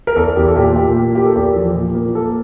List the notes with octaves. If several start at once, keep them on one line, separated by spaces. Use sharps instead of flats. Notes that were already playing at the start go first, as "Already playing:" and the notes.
A#4
E2 A4
E2 G4
A4
A#2 G4
A#2 G4
A#3
A#3 G4
A4
E2 G4
F3
A#2
A#3
A#3 A4